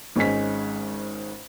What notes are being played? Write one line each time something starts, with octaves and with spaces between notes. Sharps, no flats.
G#1 G#2 C#4 D#4 G#4 B6